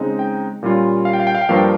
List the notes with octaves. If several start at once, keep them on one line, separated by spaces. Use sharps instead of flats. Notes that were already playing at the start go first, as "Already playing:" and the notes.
Already playing: C#3 G#3 C4 D#4
G5
A#2 G3 C#4 F4
F5
G5
F5
G5
F5
G5
G2 F3 A#3 F5
G5